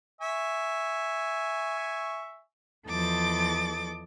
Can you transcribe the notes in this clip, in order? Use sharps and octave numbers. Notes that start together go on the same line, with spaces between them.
E5 G#5 C#6
E2 F3 A4 D#5 D6 A6